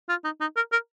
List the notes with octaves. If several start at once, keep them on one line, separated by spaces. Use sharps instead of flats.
F4
D#4
D#4
A#4
A#4